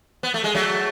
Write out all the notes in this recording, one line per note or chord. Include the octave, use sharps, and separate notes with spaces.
B3
A3
G#3
F#3 A3